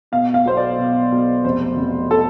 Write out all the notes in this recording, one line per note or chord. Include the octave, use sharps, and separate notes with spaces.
B2 F5
F5
B1 C5
D5
B2
B1
F1 C5
F1
A4